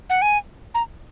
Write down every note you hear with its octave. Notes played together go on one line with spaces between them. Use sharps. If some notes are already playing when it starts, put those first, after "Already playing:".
F#5
G#5
A#5